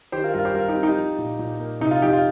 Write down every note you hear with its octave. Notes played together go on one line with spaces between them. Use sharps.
D#3 G4 C5
F4 A#4
G2 F4 A#4
G4 C5
G2 F4 A#4
D#4 G4
C4
D#4 G4
F3
A#2
A#2
A#3
C3 D#4
F4
F2 D#4 G4
F4